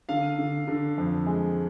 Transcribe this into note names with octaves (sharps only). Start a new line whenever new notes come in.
D3 F5
D3
D3
F2
G#3